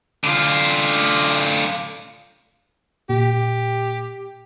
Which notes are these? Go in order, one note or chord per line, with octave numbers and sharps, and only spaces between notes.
D3 F4
A#2 G4